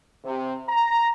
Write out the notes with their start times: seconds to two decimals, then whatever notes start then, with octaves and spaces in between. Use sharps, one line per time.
0.24 C3
0.69 A#5